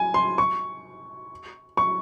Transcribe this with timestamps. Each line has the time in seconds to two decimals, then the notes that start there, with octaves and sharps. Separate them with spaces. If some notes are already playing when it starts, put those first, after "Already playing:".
Already playing: G#5
0.14 C6
0.38 C#6
1.77 C#6